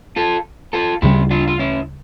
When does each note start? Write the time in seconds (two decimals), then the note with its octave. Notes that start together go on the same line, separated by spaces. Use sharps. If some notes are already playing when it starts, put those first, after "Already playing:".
0.16 F4 A4
0.73 F4 A4
1.02 D2 C#3 G3 E4 G4
1.31 D4 F4
1.48 F4
1.59 C#4 E4